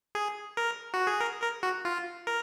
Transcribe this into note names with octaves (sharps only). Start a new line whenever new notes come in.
G#4
A#4
F#4
G#4
A#4
A#4
F#4
F4
A#4